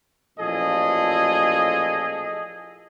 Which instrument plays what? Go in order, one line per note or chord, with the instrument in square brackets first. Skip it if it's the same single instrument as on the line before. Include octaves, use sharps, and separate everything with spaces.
[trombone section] A1 A#2 F3 [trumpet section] G#4 A4 D#5